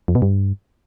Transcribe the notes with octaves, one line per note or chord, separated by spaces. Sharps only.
F2
B2
G2